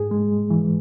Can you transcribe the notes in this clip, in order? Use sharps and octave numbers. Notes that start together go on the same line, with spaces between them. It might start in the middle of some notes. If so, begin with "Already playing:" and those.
Already playing: G#2 G#4
G#3
E3